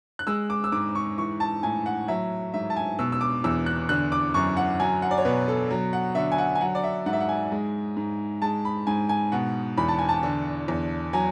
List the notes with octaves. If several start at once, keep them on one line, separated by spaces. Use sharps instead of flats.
F#6
G#3 E6
D6
E6
G#2 D6
C#6
E3 C#6
A5
A2 G#5
F#5
F#3 E5
G#2 E5
A5
G#5
B2 E6
E6
D6
E2 E6
F#6
D3 F#6
D6
F#2 C#6
F#5
F#3 G#5
F#5
D5
C#5
B2 B4
A4
F#3
F#5
D3 E5
G#5
F#5
G#5
F#3 F#5
D5
E5
G#2 F#5
E5
F#5
G#5
G#3
G#2
G#3 A5
B5
G#2 G#5
G#5
B2 F#5
E2 B5
A5
G#5
A5
D3
E2
F#3 G#5